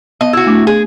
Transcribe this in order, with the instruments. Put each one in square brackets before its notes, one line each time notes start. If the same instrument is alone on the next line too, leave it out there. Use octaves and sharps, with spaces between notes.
[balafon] B3 [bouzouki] D#5
[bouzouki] E4 F#4
[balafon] A3 D4 D6
[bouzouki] G#4